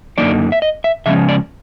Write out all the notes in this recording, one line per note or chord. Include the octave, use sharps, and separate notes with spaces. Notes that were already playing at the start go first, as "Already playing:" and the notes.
F#2 D3 G3 A#3 D#4 D5
E5
D#5
E5
C#3 F3 G#3 C#4 E5
D5